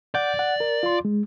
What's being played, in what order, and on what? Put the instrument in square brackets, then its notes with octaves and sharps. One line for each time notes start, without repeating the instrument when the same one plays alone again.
[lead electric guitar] D5 [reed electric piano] F#5 G6
[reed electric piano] F#5
A#4
F4 C6
G#3